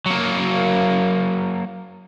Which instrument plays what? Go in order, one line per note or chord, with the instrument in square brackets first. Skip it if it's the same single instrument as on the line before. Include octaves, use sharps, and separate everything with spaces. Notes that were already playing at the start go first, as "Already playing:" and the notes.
[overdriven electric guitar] F#3 A#3